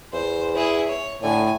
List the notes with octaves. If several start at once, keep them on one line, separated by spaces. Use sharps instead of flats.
E2 C5
E4 G#4
C#5
A2 D3 G#5